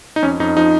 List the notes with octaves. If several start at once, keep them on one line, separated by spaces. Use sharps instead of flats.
D#4
F2 C#4
F2 D#4
F3 D#4